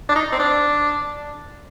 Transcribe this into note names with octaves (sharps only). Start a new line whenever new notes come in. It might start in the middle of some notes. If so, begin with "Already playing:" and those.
D4
D#4
C4
D4